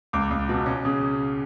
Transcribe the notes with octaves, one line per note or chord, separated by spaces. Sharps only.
C#2 D6
C#2
B2
C#4
C#3